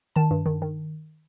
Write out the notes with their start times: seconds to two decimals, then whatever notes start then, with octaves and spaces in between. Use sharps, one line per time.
0.16 D#3 A5
0.31 G2
0.46 D#3
0.62 D#3